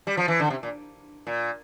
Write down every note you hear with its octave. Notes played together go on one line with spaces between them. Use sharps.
G3
F3
E3
D3
C3
A#2
A#2